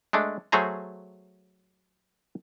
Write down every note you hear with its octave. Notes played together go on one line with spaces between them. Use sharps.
G#3 A3 D4
F#3 A3 G#4 C5 G#5 A#5